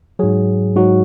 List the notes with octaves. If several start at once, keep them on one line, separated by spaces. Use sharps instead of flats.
G#2 F#3 G#4
G#2 F#3 F#4